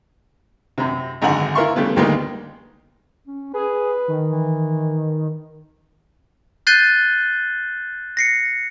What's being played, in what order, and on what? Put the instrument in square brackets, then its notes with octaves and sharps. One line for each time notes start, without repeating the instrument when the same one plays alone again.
[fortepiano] F#2 C3
G#1 F#2 D3 F#5 G#5 A#5
E4 F4 A#4 E5 C6 C#6
C#3 G3 A3 B3
D2 D#3 G3 G#3 A#3 B3
[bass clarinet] C#4
[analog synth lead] G#4 [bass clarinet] B4
[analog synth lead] D#3
[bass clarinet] E3
[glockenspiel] F#6 G6 A6 C7 D#7 G7
A#6 C7 C#7